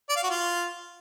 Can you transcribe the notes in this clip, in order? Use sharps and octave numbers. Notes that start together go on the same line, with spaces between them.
D5
F5
F#4
F4